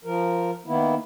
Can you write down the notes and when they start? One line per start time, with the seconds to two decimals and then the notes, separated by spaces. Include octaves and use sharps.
0.05 F3 A#4
0.66 D#3 A#3 B3 E4